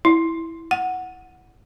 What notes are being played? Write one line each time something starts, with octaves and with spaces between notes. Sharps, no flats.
E4
F#5